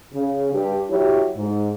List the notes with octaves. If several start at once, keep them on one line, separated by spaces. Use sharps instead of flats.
C#3
G2 G4
F#3 E4 G4 C#5
G#2